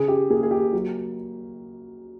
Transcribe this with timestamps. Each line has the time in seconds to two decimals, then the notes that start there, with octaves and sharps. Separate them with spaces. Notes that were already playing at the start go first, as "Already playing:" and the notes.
Already playing: C#3 G#4
0.08 G4
0.30 A#3 G#4
0.43 G#4
0.51 G4
0.73 F#3